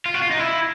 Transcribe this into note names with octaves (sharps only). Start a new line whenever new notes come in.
F4
F#4
F4
D#4
E4